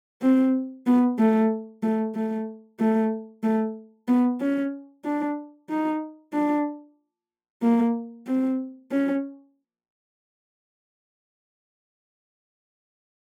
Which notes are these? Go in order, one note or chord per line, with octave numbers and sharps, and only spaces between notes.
C4
B3
A3
A3
A3
A3
A3
B3
C#4
D4
D#4
D4
A#3
C4
C#4